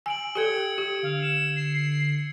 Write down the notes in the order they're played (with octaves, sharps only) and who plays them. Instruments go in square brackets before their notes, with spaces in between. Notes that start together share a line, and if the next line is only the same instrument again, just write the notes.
[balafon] G#5 [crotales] E6 D7 F#7
[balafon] G4 A4 [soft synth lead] G5 [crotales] G#6 C#7 G7
[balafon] G4
[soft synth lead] D3 [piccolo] F5
[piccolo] E7
C7